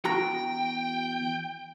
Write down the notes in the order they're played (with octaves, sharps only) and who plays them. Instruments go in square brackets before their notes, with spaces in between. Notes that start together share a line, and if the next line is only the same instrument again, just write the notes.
[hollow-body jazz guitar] E2 F#4 A#5 [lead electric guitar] G5